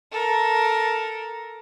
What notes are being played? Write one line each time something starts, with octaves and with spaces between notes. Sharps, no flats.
A4 A#4